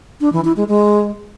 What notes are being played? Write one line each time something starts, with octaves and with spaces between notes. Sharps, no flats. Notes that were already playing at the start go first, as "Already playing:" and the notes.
D4
E3
E4
G#3
G#3